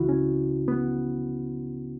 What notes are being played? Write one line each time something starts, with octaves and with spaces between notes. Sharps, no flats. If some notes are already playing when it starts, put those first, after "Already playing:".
Already playing: C#2 C#3 E3 E4 F#4
C#4
B3